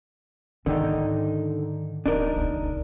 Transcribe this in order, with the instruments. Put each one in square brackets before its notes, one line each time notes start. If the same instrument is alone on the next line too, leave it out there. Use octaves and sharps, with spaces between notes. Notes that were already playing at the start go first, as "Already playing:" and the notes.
[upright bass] G#2 [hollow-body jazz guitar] D3 D#3 D#4
[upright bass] D1 F3 [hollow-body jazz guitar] D4 D#4 A#4
[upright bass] D#1 C#2